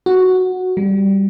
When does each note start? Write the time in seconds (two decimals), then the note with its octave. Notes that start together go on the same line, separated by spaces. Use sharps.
0.06 F#4
0.77 G3